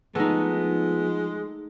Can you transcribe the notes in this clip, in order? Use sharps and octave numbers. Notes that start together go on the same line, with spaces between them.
F3 G#3 A3 B3 D#4